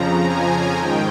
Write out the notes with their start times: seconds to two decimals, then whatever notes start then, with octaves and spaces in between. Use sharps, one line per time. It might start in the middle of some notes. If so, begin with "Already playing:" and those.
Already playing: F2 C#3 F3 A#5
0.24 G#5
0.76 G#2 D#3 G5